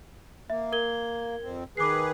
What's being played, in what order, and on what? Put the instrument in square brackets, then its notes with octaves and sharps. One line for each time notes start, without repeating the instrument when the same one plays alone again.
[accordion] A#3 [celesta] E5
[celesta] A#4 G#6 G7
[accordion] F2 C4
[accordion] D#3 G#4 B4 [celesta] D6 C7